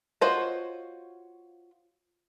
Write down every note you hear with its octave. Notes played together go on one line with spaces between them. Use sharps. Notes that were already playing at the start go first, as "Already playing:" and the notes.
F4 F#4 C5 C#5 D#5